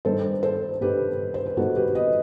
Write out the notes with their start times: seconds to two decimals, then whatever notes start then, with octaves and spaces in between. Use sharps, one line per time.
0.05 G2 D#3 G3 A4 C5
0.43 A4 C5
0.81 G2 D#3 G3 G4 B4
1.34 C5
1.46 B4
1.57 G2 D#3 G3 F#4 A4
1.76 G4 B4
1.95 B4 D#5